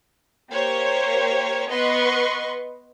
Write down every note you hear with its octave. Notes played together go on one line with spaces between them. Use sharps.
A#3 G4 C5 C#5
B3 B4 D#5 C6 C#6